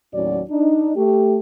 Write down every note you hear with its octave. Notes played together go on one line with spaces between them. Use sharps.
D#2 A2 F#3 C#4 F#4 D5
D4 D#4
A3 G4